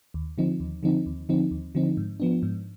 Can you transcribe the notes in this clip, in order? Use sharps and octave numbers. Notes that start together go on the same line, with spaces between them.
D#2
D3 F3 C4 D#4
D#2
D3 F3 C4 D#4
D#2
D3 F3 C4 D#4
D#2
D3 F3 C4 D#4
G#2
F3 B3 D4
G#2